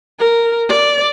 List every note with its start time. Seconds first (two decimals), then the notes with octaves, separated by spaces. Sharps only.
0.19 A#4
0.69 D5